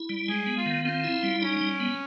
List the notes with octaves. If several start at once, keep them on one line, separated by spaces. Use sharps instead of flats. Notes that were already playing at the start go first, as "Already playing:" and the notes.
Already playing: E4
G3
G#3 G#4
B3
F4
D#3
C4 F4
E4
G3
C#4 D#4
G3
B3